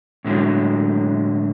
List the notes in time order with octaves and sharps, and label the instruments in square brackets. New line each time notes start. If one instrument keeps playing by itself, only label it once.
[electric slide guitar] A2 D3 F#3 G#3